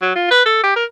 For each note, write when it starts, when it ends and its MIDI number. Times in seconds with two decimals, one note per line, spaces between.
0.02 0.13 54
0.16 0.31 65
0.31 0.43 71
0.46 0.62 69
0.63 0.75 67
0.76 0.85 70